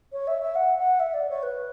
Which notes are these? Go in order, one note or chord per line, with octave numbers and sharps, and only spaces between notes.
C#5
E5
E5
F#5
F#5
E5
D5
C#5
B4